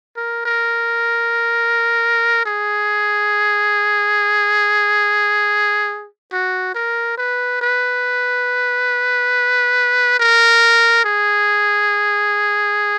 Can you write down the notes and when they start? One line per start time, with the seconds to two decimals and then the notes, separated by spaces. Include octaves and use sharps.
0.16 A#4
0.45 A#4
2.46 G#4
6.32 F#4
6.75 A#4
7.17 B4
7.61 B4
10.19 A#4
11.04 G#4